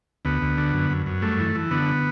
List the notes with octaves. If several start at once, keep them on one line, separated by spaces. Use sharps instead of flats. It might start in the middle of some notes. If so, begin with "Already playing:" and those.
D2 B3
D2
D3
F#2
F#2
F#2
G2 A3
E3
E3
D3 B3